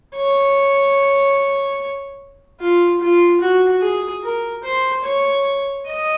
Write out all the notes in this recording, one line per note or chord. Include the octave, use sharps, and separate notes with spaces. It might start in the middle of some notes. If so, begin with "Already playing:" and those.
C#5
F4
F4
F#4
G#4
A#4
C5
C#5
D#5